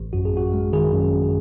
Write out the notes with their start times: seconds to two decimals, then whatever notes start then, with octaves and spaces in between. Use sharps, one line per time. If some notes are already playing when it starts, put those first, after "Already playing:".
Already playing: A1
0.13 F#2 F#4
0.25 G#4
0.33 F#2 F#4
0.53 G#3
0.73 D#3 G#4
0.93 F#2
1.13 F#2